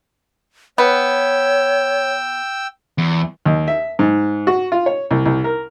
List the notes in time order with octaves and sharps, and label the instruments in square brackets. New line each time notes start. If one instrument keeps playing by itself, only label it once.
[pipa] B3 [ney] C#5 [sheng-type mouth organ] G5 E6
[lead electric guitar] E2
[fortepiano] D#2
E5
G#2
F#4
F4
C#5
C2
C2
A#4